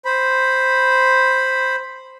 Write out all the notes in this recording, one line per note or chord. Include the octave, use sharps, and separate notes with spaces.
C5 B5